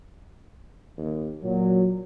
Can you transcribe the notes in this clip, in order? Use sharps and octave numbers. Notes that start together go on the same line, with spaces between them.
D#2
A#2 F#3